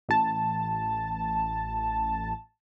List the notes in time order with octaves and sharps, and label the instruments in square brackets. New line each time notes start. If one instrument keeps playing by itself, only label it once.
[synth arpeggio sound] A1 A5